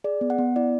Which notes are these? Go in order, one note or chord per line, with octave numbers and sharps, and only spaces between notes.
G#4 D5
B3
F#5
B3
E4 D5